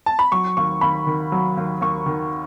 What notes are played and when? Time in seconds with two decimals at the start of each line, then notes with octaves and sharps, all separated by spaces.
0.06 A5
0.19 B5
0.32 F#3 C#6
0.57 D#2 C#6
0.81 D#2 B5
1.07 D#3
1.32 F#3
1.57 D#2
1.81 D#2 C#6
2.06 D#3